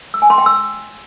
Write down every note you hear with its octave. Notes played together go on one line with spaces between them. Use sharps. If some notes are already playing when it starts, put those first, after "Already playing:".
E6
G#5
C6
G5
E6